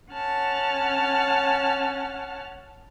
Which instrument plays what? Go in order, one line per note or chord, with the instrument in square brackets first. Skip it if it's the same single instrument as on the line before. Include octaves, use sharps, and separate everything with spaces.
[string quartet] C#4 F#5 A5 F6